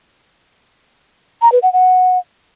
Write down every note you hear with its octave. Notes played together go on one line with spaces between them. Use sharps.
A#5
B4
F#5
F#5